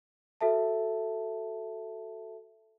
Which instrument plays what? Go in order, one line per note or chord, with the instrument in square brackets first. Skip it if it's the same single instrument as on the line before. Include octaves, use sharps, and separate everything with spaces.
[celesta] F#4 A4 E5 A5